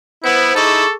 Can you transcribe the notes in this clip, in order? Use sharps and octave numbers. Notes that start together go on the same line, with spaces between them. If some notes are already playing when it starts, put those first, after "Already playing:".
B3 E4 C5 B5
D#4 E4 G#4 A4 C#6 D6